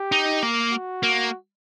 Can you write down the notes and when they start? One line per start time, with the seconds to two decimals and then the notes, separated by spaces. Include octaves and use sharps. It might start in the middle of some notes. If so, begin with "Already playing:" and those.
Already playing: G4
0.12 D#4
0.43 A#3
0.72 F#4
1.03 A#3